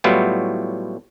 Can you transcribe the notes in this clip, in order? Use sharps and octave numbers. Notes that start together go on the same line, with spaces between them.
A2 F#3 G3 B3 E4 F4